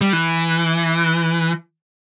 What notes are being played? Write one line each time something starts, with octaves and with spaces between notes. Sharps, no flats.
G3
E3